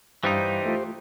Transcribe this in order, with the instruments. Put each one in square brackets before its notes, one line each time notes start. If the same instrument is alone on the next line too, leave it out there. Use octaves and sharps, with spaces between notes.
[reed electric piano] G2 F5 [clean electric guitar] E3 G3 D#4 [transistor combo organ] G4 C5
[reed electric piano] A3 F4